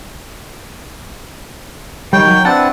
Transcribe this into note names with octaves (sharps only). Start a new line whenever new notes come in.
D#3 G3 C#5 G5
F#3
C4 D4 E4 B4 F#5 A5